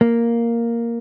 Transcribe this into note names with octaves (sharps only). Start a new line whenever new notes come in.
A#3